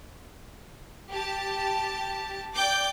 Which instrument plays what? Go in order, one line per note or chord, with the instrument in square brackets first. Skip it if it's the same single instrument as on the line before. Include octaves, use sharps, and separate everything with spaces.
[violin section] G4 A5
D5 G5 D6 G6